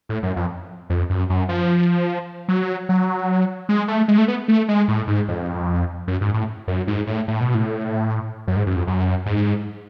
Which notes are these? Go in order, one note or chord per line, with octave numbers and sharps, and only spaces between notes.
A2
F#2
F2
F2
F#2
F#2
F3
F#3
F#3
G#3
A3
G#3
A3
B3
A3
G#3
A2
G#2
F2
F#2
G#2
A2
F#2
G#2
A2
A2
B2
A2
F#2
G#2
F#2
F2
F#2
G#2